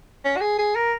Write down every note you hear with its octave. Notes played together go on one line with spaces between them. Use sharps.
C#4
F#4
G#4
G#4
A#4